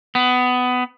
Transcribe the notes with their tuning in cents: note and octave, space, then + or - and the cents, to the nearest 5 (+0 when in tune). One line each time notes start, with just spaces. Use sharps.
B3 +20